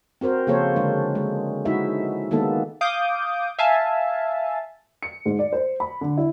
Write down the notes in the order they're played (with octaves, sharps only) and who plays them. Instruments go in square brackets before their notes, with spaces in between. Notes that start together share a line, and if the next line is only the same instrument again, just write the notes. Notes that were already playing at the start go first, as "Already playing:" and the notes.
[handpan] C4 F#4 A#4 C5
C#3 F3 A#3 A4 C5 C#5
D3 G#3 D4
G#3
G#3 D#4 E4 F#4 E5
D#3 G#3 A#3 B3 D#4 A4
[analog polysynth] F5 D6 D#6 G6
E5 F5 G#5 A5
[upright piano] C#7
G#2
D5
C5
B5
D3
E4